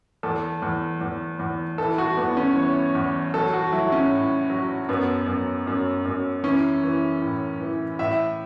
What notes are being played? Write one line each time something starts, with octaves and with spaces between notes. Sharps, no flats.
E2 A4
E2
E2
E2
E3 A4
F#4
E2 B3
C#4
E3 C#5
E2
F#3 A4
F#4
F#3 E4
C#4
A2
F#3
F#2 B3
F#2
F#2
F#2
E3 C#4
E3
A2
E3
A2 E5